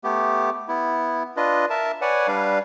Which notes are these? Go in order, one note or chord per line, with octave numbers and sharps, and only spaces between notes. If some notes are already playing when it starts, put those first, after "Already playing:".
A3 B3 G4
B3 E4
D4 F4 B4 D#5
A#4 E5 A5
B4 C#5 D5 F#5 G#5
G3 D4 B4 F5